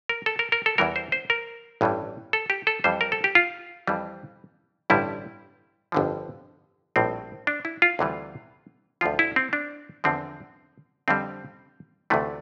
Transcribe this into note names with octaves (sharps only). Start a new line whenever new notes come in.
A#4
A4
A#4
A#4
A4
E2 E3 G3 A#4
C5
C5
A#4
A1 G2 E3 G3
A4
G4
A4
F2 E3 G3 C5
A#4
A4
G4
F4
F2 E3 G3
A1 G2 D3 G3 E4
G1 F2 D3 F3
A#1 A2 G3 C4
D4
E4
F4
D2 C3 E3 G3
D2 D3 F3 F4
E4
C4
D4
E2 D3 F3 C4
F2 D3 G3 C4
D2 C3 E3 A3